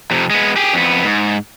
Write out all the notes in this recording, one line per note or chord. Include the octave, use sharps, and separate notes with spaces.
F2 C3
G#3 B3
G4 G#4
F2 B3
G#2